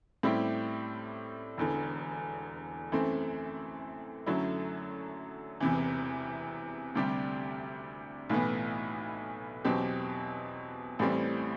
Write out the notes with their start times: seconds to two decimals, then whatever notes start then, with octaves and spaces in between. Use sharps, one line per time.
0.23 A2 G3 C4 E4 G4
1.58 E1 E2 D3
2.92 F#2 E3 A3 C4
4.26 F#2 D3 F#3 A3 E4
5.60 E1 E2 C3 E3
6.95 D2 C3 G3 D4 G4
8.30 B1 A2 E3 B3
9.65 E2 B2 F#3 C4 G4
10.99 A1 A2 E3 G3 C4